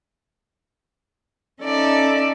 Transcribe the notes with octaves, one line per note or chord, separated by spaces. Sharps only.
C#4 D#4 A4 D5 E5